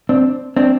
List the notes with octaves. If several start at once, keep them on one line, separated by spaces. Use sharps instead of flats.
C4 D4
C4 D4